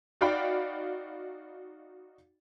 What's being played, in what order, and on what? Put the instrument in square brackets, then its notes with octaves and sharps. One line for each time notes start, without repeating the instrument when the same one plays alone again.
[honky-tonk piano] D#4 F#4 D5 F5 G5 B5